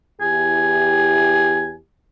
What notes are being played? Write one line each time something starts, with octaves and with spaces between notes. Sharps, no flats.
E2 E4 G4 G#5